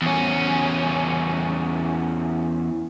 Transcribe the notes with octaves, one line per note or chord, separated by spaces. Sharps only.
E2 C#4